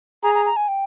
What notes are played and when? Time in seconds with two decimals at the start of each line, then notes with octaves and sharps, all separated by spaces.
0.23 G#4 A#5
0.35 A#5
0.46 A#5
0.56 G#5
0.68 G5